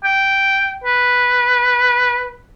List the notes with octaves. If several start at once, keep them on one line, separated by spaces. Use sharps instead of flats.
G5
B4